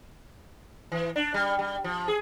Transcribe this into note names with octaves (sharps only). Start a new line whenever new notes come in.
E3
D4
G3
G3
F3
G#4